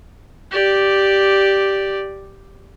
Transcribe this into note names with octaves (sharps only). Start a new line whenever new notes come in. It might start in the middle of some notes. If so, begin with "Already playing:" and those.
G4 D5